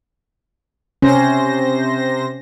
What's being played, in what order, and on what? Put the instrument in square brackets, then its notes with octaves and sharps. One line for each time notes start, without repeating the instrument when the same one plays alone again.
[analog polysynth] C3 C5 A#6 [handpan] C#4